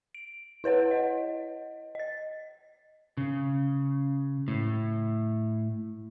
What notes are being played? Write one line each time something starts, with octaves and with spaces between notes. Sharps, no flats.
D7
E4 B4 C#5 F#5
D#5
D#5 A6
C#3
A2